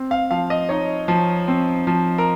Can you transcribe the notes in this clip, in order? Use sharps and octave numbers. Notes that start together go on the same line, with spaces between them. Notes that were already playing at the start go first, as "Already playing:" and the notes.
Already playing: C4
F5
F3 F5
D#5
D#4 C#5
F3
C4
F3
A#4